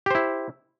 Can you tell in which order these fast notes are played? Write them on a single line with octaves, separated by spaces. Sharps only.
G4 C5 E4